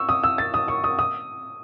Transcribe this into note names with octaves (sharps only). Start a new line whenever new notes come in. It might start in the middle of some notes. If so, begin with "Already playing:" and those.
Already playing: C#6 E6
D#6
E6
A6
D#6
C#6
D#6
D#6